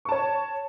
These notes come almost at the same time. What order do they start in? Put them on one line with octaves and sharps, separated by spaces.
C#6 A5 C#5